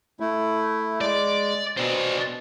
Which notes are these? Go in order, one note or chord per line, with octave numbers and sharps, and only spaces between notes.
A3 E4
G#3 D5
B2 D4 C5